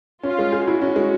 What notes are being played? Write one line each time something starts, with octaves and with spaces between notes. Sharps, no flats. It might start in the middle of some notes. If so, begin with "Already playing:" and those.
C#4 F4
G#3
G#4
E4 F#4
C#4
G#3